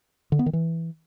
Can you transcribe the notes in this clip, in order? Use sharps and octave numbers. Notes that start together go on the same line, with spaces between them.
D3
B3
D#3
E3